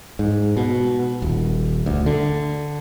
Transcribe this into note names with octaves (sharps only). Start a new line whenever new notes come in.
G#2
B2
D#1
D2
D3